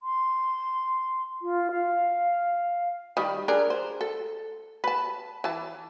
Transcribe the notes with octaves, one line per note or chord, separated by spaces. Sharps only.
C6
F4
F5
D#3 G3
D4 G#4 A#4
C5
A4
B4 A5
E3 A5